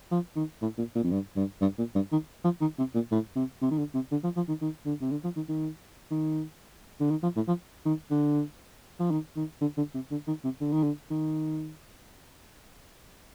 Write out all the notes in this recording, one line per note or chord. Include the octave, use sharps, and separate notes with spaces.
F3
D#3
A2
A#2
A#2
F2
G2
G2
G2
A#2
G2
D#3
F3
D#3
C3
A#2
A2
C3
C3
D#3
D3
C3
D3
F3
F3
D#3
D#3
D3
C3
D3
F3
D#3
D#3
D#3
D3
D#3
F3
A2
F3
D#3
D3
F3
D#3
D#3
D3
D3
C3
D3
D#3
C3
D3
D#3
D3
D#3